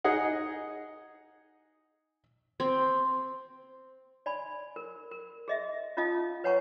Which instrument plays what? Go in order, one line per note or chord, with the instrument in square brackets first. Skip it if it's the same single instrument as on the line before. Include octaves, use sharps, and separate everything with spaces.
[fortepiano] D#4 G#4 D#5 F#5
[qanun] C4
[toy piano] D5 G#5 B5
A#4
A#4
G#4 D#5 E5
C#4 F4 D#5 F5 A5 D#6
B4 C#5 F#5 G#5 A#5 C#6